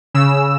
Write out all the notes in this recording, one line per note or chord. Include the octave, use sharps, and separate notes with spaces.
C#3 E6